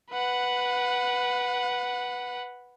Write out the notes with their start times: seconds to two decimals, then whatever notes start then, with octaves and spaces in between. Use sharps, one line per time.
0.11 B4 F#5